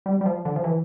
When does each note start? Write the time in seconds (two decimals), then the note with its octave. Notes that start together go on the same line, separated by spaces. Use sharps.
0.06 G3
0.21 G3
0.26 F3
0.45 D3
0.56 F3
0.64 E3